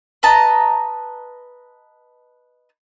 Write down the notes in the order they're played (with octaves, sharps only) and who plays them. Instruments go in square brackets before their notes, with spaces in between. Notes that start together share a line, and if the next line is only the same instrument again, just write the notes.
[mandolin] B4 D#5 A5 A#5